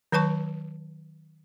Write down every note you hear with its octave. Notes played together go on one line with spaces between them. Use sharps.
D#3 F#3 B4 A5 C#6